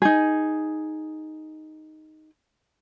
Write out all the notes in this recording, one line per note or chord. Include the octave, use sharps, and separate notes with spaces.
D#4 G#4